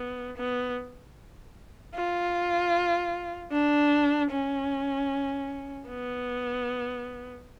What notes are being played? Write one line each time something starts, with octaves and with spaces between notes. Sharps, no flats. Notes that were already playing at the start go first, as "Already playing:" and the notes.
Already playing: B3
B3
F4
D4
C#4
B3